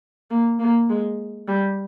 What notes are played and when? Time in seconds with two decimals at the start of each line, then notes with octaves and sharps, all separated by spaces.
0.31 A#3
0.59 A#3
0.90 G#3
1.48 G3